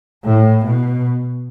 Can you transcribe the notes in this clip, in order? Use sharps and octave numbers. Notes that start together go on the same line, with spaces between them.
A2
B2